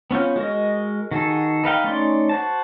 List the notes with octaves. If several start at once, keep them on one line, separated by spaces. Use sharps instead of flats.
B3 C#4 F4 G6
G#3 F#4 A#4 D#5
D#3 F#4 G#4 A4
D#4 B4 F5 G5
A3 C#4 D#4 D5 C6
F#4 C5 A5